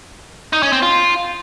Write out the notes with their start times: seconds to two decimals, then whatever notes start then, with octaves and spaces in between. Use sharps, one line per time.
0.53 D#4
0.63 C#4
0.73 C4
0.82 F4